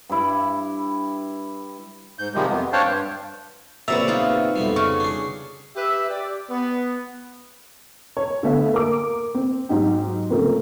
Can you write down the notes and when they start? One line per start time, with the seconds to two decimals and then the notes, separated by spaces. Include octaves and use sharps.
0.10 G2 E4
2.19 G#2 G6
2.35 C3 D#3 F3 G3 G#3
2.49 F2 B3
2.73 D4 C5 C#5 F5 G5 A5
2.85 G2
3.88 A#1 C#3 C4 F#4 B4 D5 E5 A#5
4.08 B3 D#4 F4
4.56 F2 B2 G3
4.76 C#3 C#6
5.00 D4 G#4
5.76 G4 B4 E5
6.09 G4 D5
6.50 B3
8.17 C#5
8.43 D3 A3 B3 E5 F5
8.74 A#3 D6
9.35 C4
9.69 G#2 F#3 D#4 G4
10.30 C#3 F3 A3 A#3 C4